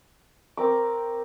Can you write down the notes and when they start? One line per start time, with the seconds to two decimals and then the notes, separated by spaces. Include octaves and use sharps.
0.57 C4 A#4 D6